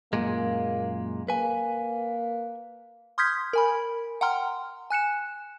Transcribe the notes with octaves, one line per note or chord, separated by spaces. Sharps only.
F#2 A#2 G#3 A#3
A#3 B4 G#5
C6 D#6 F6 G6 G#6 B6
A#4 G#5 B5
F#5 G5 A#5 C6 F6
G#5 F#6 C#7 E7